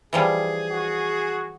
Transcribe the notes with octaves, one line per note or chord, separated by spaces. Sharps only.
E3 F3 G3 G#4
F#4